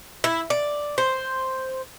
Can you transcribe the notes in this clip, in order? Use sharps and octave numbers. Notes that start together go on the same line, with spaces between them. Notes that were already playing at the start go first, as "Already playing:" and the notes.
E4
D5
C5